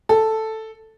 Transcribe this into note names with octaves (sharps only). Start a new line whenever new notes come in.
A4